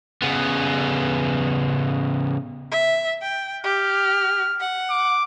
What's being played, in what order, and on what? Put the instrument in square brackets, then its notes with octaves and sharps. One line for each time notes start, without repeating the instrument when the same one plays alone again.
[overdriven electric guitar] C#3 B3
[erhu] E5
G5
[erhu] G4 [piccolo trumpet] F6
[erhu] F#5
[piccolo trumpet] D6